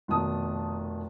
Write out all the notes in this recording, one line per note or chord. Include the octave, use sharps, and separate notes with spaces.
F1 B2 D#3 A5 D#6